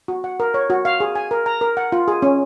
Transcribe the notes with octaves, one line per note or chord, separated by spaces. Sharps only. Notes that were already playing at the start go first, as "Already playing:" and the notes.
F#4
F#5
A#4
C#5
F#4
F5
G#4
G#5
A#4
A#5
A#4
F#5
F4
G#4
C#4